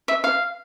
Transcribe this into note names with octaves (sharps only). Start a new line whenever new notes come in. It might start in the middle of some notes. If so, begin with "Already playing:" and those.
E5
F5